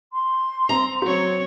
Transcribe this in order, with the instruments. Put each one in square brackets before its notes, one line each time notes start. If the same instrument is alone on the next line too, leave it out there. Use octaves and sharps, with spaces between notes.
[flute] C6
[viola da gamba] C4 [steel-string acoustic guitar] A#5
[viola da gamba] F#3 C4 C#5 [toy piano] F#4